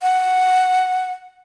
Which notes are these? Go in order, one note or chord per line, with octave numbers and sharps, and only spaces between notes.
F#5